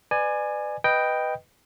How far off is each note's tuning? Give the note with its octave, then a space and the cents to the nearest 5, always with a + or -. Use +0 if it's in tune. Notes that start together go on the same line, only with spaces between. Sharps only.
B4 +20 D5 +30 G#5 +0
B4 +0 D#5 +0 G5 +0